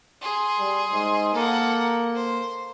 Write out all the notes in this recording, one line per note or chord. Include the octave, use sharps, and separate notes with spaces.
G#4 C6
G3
G#2
A#3 A4 F#5
C5